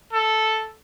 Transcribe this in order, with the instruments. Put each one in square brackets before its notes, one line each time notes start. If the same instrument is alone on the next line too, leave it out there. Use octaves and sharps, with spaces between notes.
[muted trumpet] A4